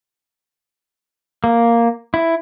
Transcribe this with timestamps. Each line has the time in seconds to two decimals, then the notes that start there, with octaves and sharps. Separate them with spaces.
1.44 A#3
2.14 E4